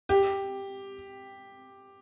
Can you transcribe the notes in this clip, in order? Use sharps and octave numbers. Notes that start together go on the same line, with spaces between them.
G4